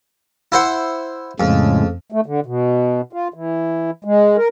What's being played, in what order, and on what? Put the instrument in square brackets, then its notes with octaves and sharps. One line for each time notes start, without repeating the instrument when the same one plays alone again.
[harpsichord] E4 C5 F#5
[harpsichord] F2 [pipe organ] A2 C#3 G#3
[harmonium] A3
D3
B2
F4
E3
G#3
A#4